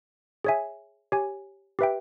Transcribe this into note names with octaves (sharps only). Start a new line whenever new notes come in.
G#4 C#5 E5 G#5
G4 C#5 G#5
G4 B4 E5 G5